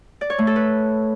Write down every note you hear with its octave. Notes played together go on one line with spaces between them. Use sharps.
D5
C#5
A3
A4
B4